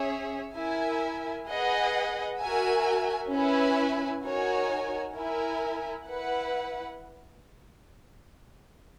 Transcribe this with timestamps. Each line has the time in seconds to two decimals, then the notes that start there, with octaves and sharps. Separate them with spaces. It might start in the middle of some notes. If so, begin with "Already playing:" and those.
Already playing: C#4 G#4 C#5 E5
0.55 E4 A#4 E5 G#5
1.47 G#4 B4 D#5 F#5
2.39 F#4 A#4 E5 G#5
3.32 C#4 E4 B4 E5 G#5
4.24 D#4 F#4 A#4 C#5 G#5
5.15 E4 A#4 E5 G#5
6.07 E4 B4 F#5